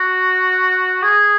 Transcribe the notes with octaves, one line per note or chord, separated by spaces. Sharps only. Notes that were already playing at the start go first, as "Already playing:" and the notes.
Already playing: F#4
G#4